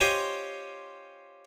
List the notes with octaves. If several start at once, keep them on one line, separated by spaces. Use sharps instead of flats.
C#4 F4 G4 C5 D#5 G#5